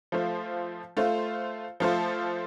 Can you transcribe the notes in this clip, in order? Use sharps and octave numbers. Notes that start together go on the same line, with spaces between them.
F3 A3 F4 C5
A3 F4 C5
F3 A3 F4 A4 C5